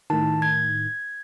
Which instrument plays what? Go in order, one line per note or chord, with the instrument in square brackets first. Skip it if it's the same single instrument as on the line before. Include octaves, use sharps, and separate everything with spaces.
[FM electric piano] A2 D#3 [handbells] A5
[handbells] G#6